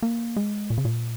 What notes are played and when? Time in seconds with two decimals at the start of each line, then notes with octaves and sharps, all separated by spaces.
0.03 A#3
0.36 G#3
0.70 A#2
0.78 C#3
0.85 A#2